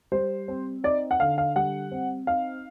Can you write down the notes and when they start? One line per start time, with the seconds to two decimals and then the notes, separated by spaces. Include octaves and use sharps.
0.12 G3 C5
0.48 C4
0.84 D#4 D5
1.11 F#5
1.20 D3 F5
1.38 F5
1.55 G3 F#5
1.91 C4
2.27 D#4 F5